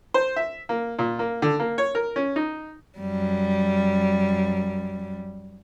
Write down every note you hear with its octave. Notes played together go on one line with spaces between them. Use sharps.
C5
E5
A#3
A#2
A#3
D3
A#3
C#5
A#4
C#4
D#4
F#2 G3